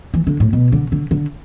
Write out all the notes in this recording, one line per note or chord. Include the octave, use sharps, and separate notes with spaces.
E3
D3
A2
B2
D3
D3
D3